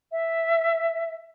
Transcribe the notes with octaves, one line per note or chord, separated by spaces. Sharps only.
E5